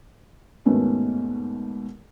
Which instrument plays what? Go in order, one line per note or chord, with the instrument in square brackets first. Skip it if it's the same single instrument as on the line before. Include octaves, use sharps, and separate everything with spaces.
[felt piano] D#2 G#2 B2 A3 B3 C#4